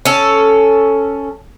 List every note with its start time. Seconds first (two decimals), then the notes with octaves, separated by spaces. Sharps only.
0.05 C#4 A4